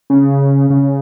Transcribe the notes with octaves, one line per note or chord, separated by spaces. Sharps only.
C#3
C#3